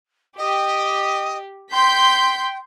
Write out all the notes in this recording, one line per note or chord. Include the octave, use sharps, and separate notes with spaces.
G4 D#5
G5 C6 G6 B6